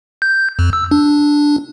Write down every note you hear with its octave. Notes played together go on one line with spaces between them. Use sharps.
G6
F2
E6
D4